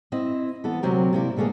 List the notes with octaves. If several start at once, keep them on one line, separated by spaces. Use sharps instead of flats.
C4 E4 D#5
E3 B3 A4
D2 C3 F#3 C4 A#4
C3 A#3 E4 D5
B2 D3 A3 A#3 G#4